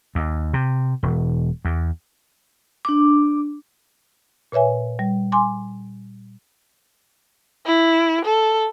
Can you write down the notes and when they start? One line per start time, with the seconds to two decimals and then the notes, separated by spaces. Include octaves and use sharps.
0.15 D#2
0.54 C3
1.03 E1
1.65 E2
2.85 D4 D6
4.52 A#2 B4 C#5 E5 G#5
4.99 G3
5.32 G#5 C6 D6
7.66 E4
8.25 A4